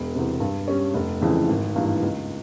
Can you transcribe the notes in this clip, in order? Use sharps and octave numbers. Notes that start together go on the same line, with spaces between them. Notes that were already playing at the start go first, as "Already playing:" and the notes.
Already playing: E1
E2 C3
G2
G3 C#4
F1
F2 C#3 E3 G#3
G#1
G2 E3 A#3
C#2